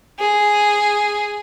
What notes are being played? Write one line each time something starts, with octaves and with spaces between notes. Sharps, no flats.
G#4